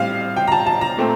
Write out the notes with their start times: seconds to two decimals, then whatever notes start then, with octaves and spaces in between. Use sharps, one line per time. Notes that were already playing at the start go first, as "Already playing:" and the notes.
Already playing: A2 G3 C4 F5
0.36 G5
0.48 A#5
0.52 A5
0.66 A5
0.81 A#5
0.97 A#2 A3 C4